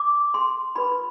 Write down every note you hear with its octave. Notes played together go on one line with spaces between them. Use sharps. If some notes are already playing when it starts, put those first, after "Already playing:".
Already playing: D6
C6
F4 B4 B5